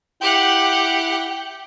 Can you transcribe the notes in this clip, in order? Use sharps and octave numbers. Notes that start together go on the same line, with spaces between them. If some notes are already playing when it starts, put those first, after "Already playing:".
E4 G4 F#5 G5